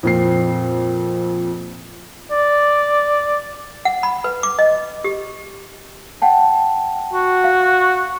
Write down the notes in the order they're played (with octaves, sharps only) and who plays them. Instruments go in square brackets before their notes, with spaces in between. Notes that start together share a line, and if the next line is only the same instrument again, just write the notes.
[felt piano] F2 A#2 C4 C7
[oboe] D5
[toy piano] F#5
B5
B4
D6
D#5
G4
[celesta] F#5 G5 A5
[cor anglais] F#4
[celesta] F5